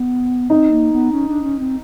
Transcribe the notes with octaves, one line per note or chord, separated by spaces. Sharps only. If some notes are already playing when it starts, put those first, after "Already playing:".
Already playing: B3
C4 D#4
A#3
B3
C#4
D4
C#4
C4